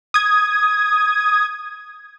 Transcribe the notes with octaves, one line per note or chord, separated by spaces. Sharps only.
D#6 G#6